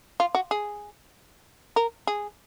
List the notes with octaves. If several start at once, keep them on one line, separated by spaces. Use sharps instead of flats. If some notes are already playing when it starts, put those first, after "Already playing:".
F4
F#4
G#4
A#4
G#4